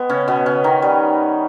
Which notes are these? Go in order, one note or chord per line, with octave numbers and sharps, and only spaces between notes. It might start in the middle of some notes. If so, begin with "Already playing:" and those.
Already playing: G#3 B3
C#3 C#4
B2 B3
C#3 C#4
D#3 D#4
G3